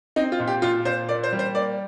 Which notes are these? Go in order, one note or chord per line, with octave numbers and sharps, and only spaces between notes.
C4 D#4
F4
A#2
G4
A#2 F4
A#2 C5
A#3 D5
C5
G3
C5
A#3 D5